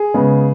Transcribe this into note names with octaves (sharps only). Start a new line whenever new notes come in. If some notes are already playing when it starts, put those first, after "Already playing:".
Already playing: G#4
C#3 G#3 B3